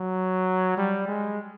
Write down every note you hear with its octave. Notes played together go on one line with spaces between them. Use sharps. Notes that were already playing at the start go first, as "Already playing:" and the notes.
Already playing: F#3
G3
G#3